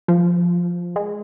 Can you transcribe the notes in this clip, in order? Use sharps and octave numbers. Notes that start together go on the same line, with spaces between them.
F3
G#3